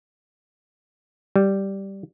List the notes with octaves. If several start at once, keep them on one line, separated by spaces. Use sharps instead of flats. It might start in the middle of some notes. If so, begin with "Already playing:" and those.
G3